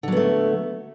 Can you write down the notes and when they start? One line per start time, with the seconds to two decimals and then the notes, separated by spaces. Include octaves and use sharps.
0.03 D3
0.08 F#3
0.12 B3
0.17 A3